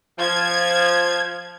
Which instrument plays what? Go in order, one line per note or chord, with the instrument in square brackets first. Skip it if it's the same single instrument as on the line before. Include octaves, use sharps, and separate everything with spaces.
[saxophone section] F3 [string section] G#6